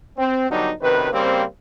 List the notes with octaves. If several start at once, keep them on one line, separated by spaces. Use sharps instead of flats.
C4
D3 F#3 G3 B3 D4 D#4
F#2 C3 D#3 B4
C#3 G3 A#3 C4